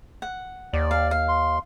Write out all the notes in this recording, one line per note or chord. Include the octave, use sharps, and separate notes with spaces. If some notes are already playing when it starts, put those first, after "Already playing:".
F#5
D#2 D5
F5
F5
C6